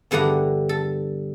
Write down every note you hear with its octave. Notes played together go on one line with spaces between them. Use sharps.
E2 G2 D3 F#5 A#5
A4